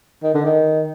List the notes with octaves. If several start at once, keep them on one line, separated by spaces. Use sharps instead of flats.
D#3
D3
D#3